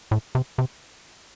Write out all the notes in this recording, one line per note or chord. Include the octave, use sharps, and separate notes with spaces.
A2
C3
C3